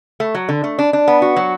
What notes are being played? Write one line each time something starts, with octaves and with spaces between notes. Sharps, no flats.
A3
F#3
D3
A3
D4
D4
B3
F#4
F#3